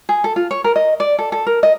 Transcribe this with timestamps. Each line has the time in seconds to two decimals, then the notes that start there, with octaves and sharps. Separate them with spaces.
0.09 G#4
0.24 A4
0.36 F4
0.51 C#5
0.64 A#4
0.76 D#5
1.00 D5
1.19 A4
1.32 A4
1.47 A#4
1.63 D#5